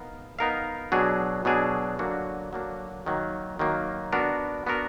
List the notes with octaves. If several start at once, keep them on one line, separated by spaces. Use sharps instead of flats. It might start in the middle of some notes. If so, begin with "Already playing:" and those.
Already playing: B3 D#4 A#4 F5
B3 D#4 A#4 F5
B2 F#3 D4 G#4
B2 F#3 D4 G#4
D3 F#3 A#3 D4 F#4
D3 F#3 A#3 D4 F#4
D#3 F#3 A#3
D#3 F#3 A#3
B3 D4 F#4 A#4
B3 D4 F#4 A#4